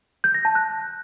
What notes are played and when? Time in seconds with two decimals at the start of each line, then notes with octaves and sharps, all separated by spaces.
0.24 G6
0.34 A#6
0.45 A5
0.55 F#6